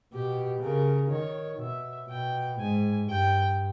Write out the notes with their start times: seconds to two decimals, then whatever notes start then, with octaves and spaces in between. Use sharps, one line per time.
0.13 B2 G4
0.62 C#3 A#4
1.11 D#3 C#5
1.61 B2 E5
2.10 B2 G5
2.60 G#2 G#5
3.09 G2 G5